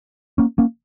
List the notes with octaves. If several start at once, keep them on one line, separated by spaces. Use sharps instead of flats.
A#3 C#4
A#3 C#4